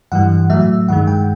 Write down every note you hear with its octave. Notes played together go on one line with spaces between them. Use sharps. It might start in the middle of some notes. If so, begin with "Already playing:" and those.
G2 E3 G3 F#5
A2 F#3 A3 E5
G2 D#3 G#3 F#5
G5